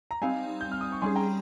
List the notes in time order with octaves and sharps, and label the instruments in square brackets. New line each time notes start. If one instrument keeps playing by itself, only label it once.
[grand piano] A#5
[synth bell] G3 C4 D#4 [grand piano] F5 G#5
[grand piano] G6
F6
D#6
C#6
[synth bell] G3 C#4 G#4 [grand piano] G#5 C6
[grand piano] G5 A#5